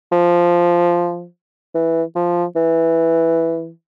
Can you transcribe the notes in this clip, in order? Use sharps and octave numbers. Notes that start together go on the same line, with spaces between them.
F3
E3
F3
E3